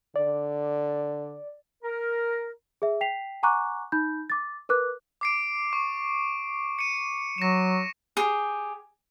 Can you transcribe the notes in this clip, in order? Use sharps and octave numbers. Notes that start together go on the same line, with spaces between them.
D3 D5
A#4
G#4 E5
G5 B6 C7 F7
F#5 G#5 A#5 C#6 D6 F#6
D#4 B5 G6
D6 A6
A#4 B4 D6 F#6
D6 C7 D7
C#6
C#7 D#7
F#3 A#6 E7
G4 G#4